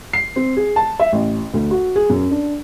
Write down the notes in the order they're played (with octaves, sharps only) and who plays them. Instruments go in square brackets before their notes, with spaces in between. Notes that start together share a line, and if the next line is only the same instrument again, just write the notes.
[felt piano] C7
C4
G#4
A5
E5
A1
D2
F#4
G#4
F#2
D4